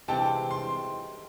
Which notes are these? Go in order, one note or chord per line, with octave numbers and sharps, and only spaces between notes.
C3 E3 G#3 C4 G5 A5
C6